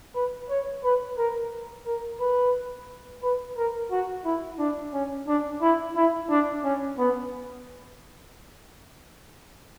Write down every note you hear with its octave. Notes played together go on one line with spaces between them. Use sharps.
B4
C#5
B4
A#4
A#4
B4
B4
A#4
F#4
E4
D4
C#4
D4
E4
E4
D4
C#4
B3